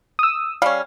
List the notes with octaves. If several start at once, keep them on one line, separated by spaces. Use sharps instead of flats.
D#6 E6
G3 C#4 F5